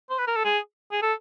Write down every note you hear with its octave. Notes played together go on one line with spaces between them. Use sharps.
C5
B4
A#4
A4
G#4
G#4
A4